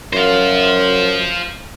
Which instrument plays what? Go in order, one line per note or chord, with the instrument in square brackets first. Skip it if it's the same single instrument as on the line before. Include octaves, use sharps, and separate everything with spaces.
[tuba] F#2 [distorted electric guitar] C5 F5